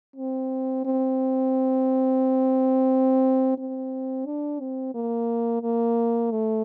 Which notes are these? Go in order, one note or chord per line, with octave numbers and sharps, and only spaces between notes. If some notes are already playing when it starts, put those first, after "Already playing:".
C4
C4
C4
D4
C4
A#3
A#3
A3